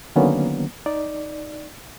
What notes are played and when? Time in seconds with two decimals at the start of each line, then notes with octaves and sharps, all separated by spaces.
0.16 D3 D#3 F#3 A#3 B3 C#4
0.86 D#4 D5